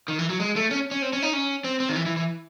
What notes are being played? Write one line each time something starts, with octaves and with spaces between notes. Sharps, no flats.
D#3
E3
F#3
G#3
A3
C#4
C#4
C4
C#4
D#4
C#4
C4
C4
D#3
E3
E3
E3